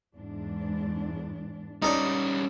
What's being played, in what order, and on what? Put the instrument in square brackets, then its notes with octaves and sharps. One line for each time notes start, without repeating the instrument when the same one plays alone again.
[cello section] E2 G#2 D4
[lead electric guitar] G3 C#4 [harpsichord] D#4 A4 D5